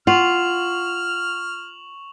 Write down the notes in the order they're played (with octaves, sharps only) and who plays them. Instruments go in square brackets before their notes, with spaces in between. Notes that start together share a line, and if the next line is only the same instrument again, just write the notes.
[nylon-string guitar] F4 [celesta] F#5 [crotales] C#6 F7 F#7 [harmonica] F6